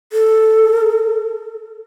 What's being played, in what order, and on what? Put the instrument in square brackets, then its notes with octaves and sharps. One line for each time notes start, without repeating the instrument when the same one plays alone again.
[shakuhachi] A4